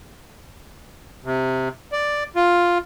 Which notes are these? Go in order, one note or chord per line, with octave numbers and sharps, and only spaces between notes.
C3
D5
F4